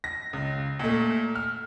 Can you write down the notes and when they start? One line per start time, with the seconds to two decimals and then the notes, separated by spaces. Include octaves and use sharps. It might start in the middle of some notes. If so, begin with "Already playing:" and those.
0.04 A#6
0.33 C#2
0.79 A#2 A3
1.35 F6